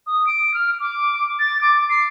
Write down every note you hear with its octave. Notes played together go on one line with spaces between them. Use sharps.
D#6
D7
F6
D6
A6
D6
C7